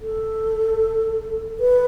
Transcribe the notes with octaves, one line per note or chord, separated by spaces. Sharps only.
A4
B4